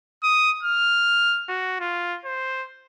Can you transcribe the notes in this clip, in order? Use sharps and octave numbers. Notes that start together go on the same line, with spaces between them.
D#6
F6
F#4
F4
C5